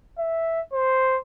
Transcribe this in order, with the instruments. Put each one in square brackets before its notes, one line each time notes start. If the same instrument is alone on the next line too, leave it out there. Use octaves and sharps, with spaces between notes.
[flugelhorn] E5
C5